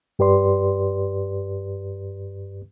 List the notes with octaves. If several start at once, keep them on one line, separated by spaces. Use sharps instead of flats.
G2 G4 B4 D5 C6